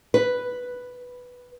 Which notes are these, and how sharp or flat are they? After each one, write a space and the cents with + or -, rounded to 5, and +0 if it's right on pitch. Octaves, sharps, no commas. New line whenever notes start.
B4 +0